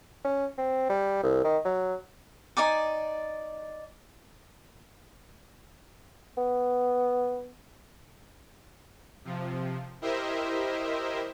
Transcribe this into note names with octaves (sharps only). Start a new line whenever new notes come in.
C#4
C4
G3
C2
D#3
F#3
D#4 D5 G#5 D6
B3
C3 F3
E4 G4 A#4 C5 D#5 E5